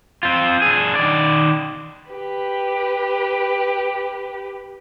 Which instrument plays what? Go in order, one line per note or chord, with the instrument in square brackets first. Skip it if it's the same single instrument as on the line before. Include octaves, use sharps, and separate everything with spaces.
[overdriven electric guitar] C4 F4
D4 G#4
D#3 D5
[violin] G4 B4